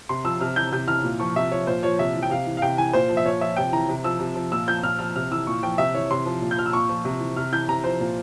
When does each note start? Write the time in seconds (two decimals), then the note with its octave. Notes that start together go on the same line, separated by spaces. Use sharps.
0.09 C3 C6
0.25 F3 E6
0.40 C3 F6
0.56 E3 G6
0.72 C3 G6
0.88 E3 F6
1.04 A#2
1.20 F3 C#6
1.36 C3 E5
1.52 F3 C#5
1.67 A#2 C5
1.83 F3 C#5
1.99 C3 E5
2.14 E3
2.22 G5
2.30 C3 F5
2.47 E3
2.57 F5
2.62 C3 G5
2.78 E3 G#5
2.93 A#2 C5
3.10 F3
3.17 E5
3.25 A#2 C#5
3.41 F3 E5
3.56 C3 G5
3.73 E3 A#5
3.89 C3
4.04 F3 E6
4.20 C3
4.36 F3
4.52 A#2 E6
4.67 F3 G6
4.83 A#2 F6
4.99 F3 F6
5.16 C3 F6
5.31 E3 E6
5.47 A#2 C#6
5.63 F3 G5
5.78 C3 E5
5.95 E3 C#5
6.10 C3 C6
6.26 F3
6.42 A#2
6.51 G6
6.57 F3 F6
6.66 E6
6.73 A#2 C#6
6.89 F3
7.05 C3
7.20 E3
7.37 C3 F6
7.52 E3 G6
7.68 C3 A#5
7.84 F3 C5
8.00 A#2